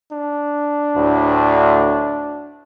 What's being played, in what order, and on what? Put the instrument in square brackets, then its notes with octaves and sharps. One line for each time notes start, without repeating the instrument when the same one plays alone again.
[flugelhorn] D4
[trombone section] D2 A2